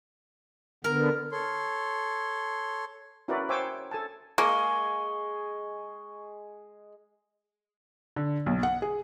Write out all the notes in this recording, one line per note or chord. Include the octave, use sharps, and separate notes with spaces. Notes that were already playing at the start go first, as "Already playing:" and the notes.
D3 B3 A#4
A4 C#5 C6
C#4 E4 F#4 A#4 B4 D5
C5 C#5 G5 G#5 D6 E6
A4 G#5 A5
G#3 A#3 G#5 C#6
D3
B1
F#5
G#4